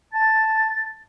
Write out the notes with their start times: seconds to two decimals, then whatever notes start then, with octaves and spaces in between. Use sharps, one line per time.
0.13 A5 A6